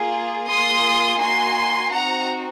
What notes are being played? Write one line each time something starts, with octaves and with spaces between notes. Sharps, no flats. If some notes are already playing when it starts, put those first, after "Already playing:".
Already playing: A#3 F4 G#4
A#3 F4 G#4 C6 D#6
A#3 D#4 F#4 G#5 C6
C4 D#4 F#4 F#5 A#5